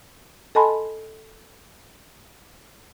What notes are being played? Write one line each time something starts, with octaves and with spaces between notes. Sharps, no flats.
A4 D#5 G#5 A5 B5 C6